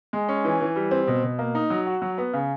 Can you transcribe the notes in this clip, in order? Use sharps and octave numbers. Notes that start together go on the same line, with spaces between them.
G#3
C#4
E3
E3
G3
C4
B2
B2
A#3
D#4
F#3
F#4
F#3
B3
C#3